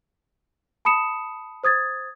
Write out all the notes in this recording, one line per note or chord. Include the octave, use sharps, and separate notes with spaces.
A5 B5 D#6 C#7 E7
C5 D#6 G#6 A6